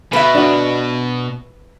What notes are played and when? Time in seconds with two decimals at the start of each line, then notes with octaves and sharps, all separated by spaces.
0.13 B2 B4 E5
0.35 D4 F#4